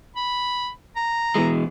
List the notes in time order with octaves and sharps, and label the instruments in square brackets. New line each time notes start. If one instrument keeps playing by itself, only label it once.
[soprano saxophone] B5
A#5
[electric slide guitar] B2 E3 G#3